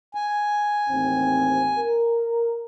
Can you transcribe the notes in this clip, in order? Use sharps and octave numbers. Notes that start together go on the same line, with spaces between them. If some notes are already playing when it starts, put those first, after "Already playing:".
G#5
A1 D#2 C4
A#4